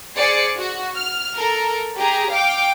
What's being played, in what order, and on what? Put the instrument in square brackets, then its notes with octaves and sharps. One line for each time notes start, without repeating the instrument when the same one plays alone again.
[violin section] G#4 C5 D5 C#7
F#4
F6
A4 A#4
G4 G#4 A#5
F5 G5 D6